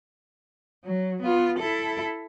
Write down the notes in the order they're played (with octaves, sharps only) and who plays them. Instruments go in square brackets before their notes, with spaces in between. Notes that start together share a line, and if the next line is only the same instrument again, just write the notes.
[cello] F#3
B3 F4
E4 A4